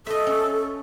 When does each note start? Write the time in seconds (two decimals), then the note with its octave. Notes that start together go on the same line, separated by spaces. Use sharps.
0.07 A4 D#5 E5
0.27 C#4